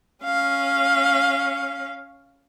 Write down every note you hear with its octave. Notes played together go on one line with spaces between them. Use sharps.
C#4 F5